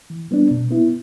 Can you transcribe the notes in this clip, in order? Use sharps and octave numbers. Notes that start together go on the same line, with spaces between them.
E3
G3 B3 D4
B2
B3 E4